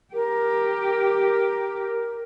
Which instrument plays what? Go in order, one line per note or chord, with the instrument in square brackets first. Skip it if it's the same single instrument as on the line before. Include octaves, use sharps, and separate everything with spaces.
[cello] G4 [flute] A#4